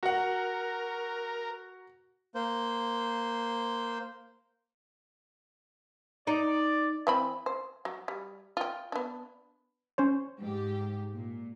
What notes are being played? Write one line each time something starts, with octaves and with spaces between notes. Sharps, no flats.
F#4 A#4 F#5
A#3 C5
D#4 D5
E3 C4 B5
C5
F#3
G3
F4 G5
B3 D4
C#4 C5 C#5
G#2 G4
A#2